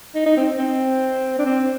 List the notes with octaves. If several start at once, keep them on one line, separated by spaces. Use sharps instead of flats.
D#4
D#4
C4
C4
D4
C4